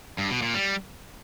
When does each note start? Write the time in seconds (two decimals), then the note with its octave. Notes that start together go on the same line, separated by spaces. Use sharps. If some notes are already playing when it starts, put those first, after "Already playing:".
0.18 G2
0.30 B2
0.42 A#2
0.54 G3